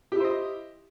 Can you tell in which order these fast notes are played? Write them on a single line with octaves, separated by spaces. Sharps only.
G4 E4 C5 D#5